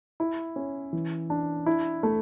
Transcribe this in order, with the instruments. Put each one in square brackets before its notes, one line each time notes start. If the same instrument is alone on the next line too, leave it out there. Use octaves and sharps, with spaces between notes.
[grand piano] E4
C#4
E3
D4
E4
A3